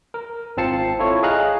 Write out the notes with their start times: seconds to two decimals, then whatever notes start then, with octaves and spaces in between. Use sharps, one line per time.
0.14 A#4
0.57 G#1 C4 F4 A5 C7 C#7
0.99 E4 F4 A4 C#5
1.23 G#4 D#5 F5 A#5 F#6